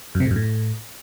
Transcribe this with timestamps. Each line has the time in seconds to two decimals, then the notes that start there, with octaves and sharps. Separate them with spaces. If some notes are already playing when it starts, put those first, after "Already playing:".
0.15 F#2
0.20 C3
0.25 A2
0.31 F#2
0.36 A2